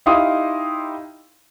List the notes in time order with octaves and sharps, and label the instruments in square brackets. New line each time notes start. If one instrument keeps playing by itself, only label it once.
[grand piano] D#4 E4 G4 F5 C6 D#6